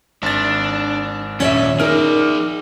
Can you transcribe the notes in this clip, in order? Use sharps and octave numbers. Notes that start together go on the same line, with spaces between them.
G#1 D4 A6
D#2 A#2 C#4 D5 E5
D#4 G#4 A#4 D5 F6